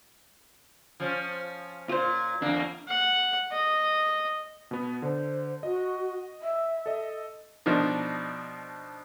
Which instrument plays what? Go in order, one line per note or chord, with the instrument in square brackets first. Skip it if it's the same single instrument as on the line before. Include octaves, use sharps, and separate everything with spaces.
[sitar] F3 C#4
[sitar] A#2 [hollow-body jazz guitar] F4 C5
[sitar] E2 A#3 [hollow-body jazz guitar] D4
[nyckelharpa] F#5
D#5
[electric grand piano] B2 B3
[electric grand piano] D3 [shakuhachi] C5
[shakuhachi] F#4 [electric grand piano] D#5
[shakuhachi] E5
[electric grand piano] A4 D#5
[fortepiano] B2 F3 D4 D#4